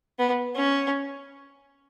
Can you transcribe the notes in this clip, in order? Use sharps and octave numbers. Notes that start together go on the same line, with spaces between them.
B3
C#4